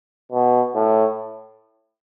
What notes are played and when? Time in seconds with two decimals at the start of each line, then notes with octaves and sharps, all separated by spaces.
0.32 B2
0.75 A2